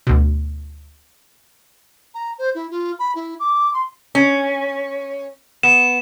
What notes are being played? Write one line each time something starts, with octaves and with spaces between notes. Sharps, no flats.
D2 B2
A#5
C5
E4
F4
B5
E4
D6
C6
C#4
B3 E7